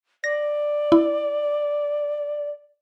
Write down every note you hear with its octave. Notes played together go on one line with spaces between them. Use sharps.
D5 A#6
E4